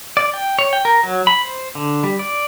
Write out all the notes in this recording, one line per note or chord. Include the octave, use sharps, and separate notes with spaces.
D5
G5
C#5
G5
A#4
F#3
B5
C5
D3
G3
D5